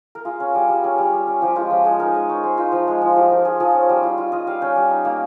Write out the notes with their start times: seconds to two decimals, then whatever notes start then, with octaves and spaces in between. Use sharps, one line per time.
0.15 A#4
0.25 F4 G#4
0.40 C#4
0.55 G3
0.69 G3
0.83 C#4 G#4
0.98 G3
1.13 G3
1.27 C#4
1.42 F3 G4
1.56 G#3 F4
1.70 F3 G4
1.85 G#3 G#4
2.00 D#4 A#4
2.15 G#3 D#5
2.29 D#4 C#5
2.43 G#3 C5
2.57 D#4 F4
2.72 F3
2.87 G#3
3.02 F3
3.16 F3 G4
3.30 F3 A#4
3.45 F3 G#4
3.60 F3 G#4
3.74 C#4
3.89 G3
4.03 F4
4.18 F4
4.32 F4 D#5
4.47 G3 F5
4.61 C#4 G5
4.76 G3
4.90 D#4
5.05 A#3